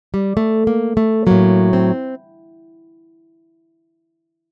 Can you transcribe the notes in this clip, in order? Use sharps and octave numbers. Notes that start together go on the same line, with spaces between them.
G3
A3
A#3
A3
A2 F#3 A#3
C4